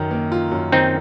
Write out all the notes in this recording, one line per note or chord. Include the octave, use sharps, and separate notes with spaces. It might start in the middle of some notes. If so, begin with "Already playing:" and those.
Already playing: F#2 D#3
A#3
F4
F#2
D#3 C4 D#4